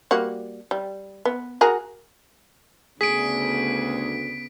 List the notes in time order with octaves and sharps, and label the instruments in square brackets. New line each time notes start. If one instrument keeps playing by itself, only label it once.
[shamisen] G3 A#3 F#4
G3
B3
F#4 G#4 A#4
[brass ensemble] D2 [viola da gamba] C#3 B3 [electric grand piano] G#4 [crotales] B6 D7